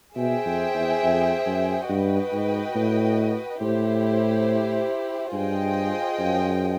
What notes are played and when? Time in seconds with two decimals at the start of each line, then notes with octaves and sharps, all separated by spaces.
0.16 B2 G#4 C5 E5 G5
0.46 F2
0.74 E2
1.03 F2
1.46 F#2
1.88 G2 F#4 B4 D#5 G5
2.32 G#2
2.75 A2
3.61 A2 E4 G4 C5
5.33 G2 F4 G#4 C5 D#5 G5
6.19 F#2